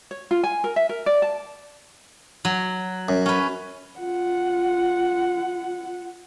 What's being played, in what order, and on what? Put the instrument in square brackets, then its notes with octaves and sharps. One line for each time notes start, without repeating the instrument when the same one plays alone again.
[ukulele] C#5
F4
G#5
A#4
E5
A#4
D5
A5
[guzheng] F#3
[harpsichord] F#2
[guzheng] C#4 B4
[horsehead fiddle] F4 F#5